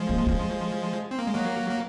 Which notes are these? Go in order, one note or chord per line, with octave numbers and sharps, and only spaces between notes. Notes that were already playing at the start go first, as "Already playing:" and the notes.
Already playing: F3 G#3
A#3
C#4
C4
A#3
G#3
F#3 A#3
A#3